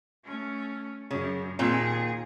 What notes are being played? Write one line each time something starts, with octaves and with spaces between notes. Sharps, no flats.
A3 C#4
F#2 C#3
D#2 A#2 C4 G#4 G5